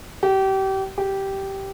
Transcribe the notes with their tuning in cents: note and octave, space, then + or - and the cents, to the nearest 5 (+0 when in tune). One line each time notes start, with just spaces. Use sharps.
G4 -30
G4 -10